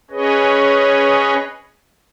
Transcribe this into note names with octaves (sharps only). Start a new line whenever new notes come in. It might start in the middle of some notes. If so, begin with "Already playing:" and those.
C#4 G#4 B4 C#5 D#5